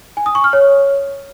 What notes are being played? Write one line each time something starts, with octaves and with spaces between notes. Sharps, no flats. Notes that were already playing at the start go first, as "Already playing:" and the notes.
G#5
D#6
C#6
F6
C#5